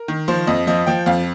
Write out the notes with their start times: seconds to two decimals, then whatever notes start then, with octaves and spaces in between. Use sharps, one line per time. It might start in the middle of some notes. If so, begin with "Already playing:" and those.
Already playing: A#4
0.08 D#3
0.28 F3 C5
0.47 F2 D#5
0.67 F3 D#5
0.87 F3 G5
1.06 F2 F5